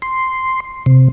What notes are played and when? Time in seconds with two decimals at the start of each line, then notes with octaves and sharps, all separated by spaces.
0.02 C6
0.86 C3